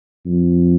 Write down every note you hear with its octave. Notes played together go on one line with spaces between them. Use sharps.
F2